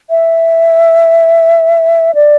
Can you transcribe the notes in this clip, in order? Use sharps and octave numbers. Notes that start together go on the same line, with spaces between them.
E5
D5